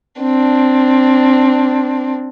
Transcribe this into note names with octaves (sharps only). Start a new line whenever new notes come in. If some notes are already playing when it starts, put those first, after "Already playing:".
C4 D4